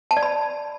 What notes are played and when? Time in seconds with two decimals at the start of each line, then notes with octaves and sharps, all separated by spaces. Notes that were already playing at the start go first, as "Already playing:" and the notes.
0.11 A5
0.17 D5
0.23 B5